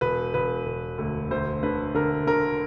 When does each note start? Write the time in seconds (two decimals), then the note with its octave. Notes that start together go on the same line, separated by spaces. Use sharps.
0.01 E1 B4
0.34 E1 B4
0.66 E1
0.98 D2
1.31 D2 C5
1.63 D3 B4
1.94 D3 A#4
2.27 D3 A#4